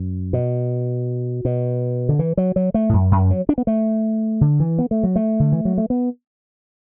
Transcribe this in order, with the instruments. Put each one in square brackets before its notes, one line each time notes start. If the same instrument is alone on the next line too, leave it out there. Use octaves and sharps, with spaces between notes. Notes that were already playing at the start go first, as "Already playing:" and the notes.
Already playing: [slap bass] F#2
B2
B2
D3
E3
F#3
F#3
A3
A2
F#2
F#2
F#3
D4
B3
A3
D3
E3
B3
A3
F#3
A3
D3
E3
F#3
A3
B3